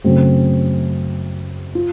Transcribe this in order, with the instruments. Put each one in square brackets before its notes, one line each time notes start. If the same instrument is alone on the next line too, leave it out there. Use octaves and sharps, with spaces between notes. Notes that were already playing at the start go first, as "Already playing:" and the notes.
[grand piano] F#2 C#3 F#3 A3 C4
F4